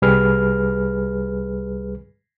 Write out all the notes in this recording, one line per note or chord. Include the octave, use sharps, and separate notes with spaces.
C2 G3 G#4 B4 F6